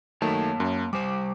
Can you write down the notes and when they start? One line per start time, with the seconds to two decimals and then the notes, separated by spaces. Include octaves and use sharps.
0.22 D#3 F#3 A3 A#3 C#5 A5
0.60 F#2
0.93 G3 C5 D6